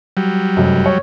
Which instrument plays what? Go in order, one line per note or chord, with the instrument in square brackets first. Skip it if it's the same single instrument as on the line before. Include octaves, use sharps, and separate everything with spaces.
[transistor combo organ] F#3 G3
[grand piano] F1 F#2
C#5